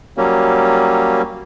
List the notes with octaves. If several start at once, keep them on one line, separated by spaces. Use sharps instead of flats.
F#3 G3 A#3 C#4